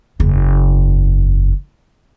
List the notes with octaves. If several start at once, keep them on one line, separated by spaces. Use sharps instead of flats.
F#1 E2